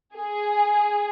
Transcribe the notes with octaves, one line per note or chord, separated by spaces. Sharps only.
G#4